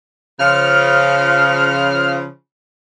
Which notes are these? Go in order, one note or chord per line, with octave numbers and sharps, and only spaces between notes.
C#3 F3 F6